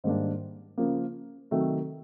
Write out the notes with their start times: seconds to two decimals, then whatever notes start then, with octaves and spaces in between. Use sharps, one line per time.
0.04 G#2 D#3 G3 A#3 D4
0.78 C#3 F3 A#3
1.51 C3 D#3 F#3 A3